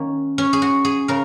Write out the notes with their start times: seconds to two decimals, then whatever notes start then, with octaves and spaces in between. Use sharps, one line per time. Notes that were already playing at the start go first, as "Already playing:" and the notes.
Already playing: D#3 A#3 C#4
0.38 C#4
0.53 G#4
0.62 F#4
0.85 G#4
1.08 C#3 A#4